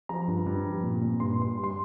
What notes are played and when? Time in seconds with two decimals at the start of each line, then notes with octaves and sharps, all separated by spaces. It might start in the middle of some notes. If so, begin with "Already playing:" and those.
0.09 F3 A#5
0.28 G2
0.46 G2
0.65 F3
0.83 A#2
1.01 A#2
1.20 G2 C6
1.39 G2 C6
1.57 G3
1.64 C6